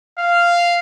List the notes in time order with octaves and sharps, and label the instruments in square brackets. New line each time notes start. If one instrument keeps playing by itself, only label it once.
[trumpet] F5